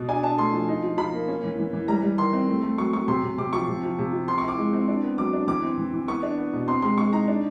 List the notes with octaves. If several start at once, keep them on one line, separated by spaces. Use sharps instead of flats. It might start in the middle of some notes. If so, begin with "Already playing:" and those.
Already playing: B2
D4 G#5
D4 A5
A3 C6
F3
D#4
F3
F3 B5
A#3
C#4
E3
E3
E3
G3 A#5
G3
D#3 C6
C4
A3
A3
F#3 C#6
F#3 C#6
C3 C6
C3
C3 D6
F3 C#6
C3
F3
C3
F3
C4 C6
C#6
E4 D6
G#3
C4
D4
B3
F#3 D6
D4
E3 D6
C4
E3
E3
B3 C#6
D4
B3
B2
C4 C6
G#3 C6
G#3 C#6
D#4 A#5
D4